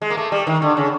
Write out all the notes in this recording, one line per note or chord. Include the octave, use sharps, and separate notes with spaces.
G#3
A#3
A3
G3
D#3
D3
C#3